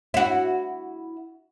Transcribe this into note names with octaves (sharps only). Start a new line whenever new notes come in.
E4 F#4